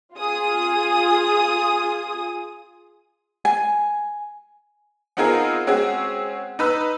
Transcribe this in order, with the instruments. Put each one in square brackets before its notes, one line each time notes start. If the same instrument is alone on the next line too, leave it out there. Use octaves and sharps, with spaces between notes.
[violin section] F4 G#4 D#6
[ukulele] G#5
[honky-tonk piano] B3 C4 D#4 F4 G#4 A#4
G#3 C4 C#4 F#4 G#4
D#4 B4 E6